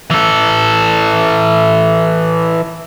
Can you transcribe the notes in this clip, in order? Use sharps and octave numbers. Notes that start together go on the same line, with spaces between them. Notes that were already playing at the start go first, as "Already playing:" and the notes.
E3 A4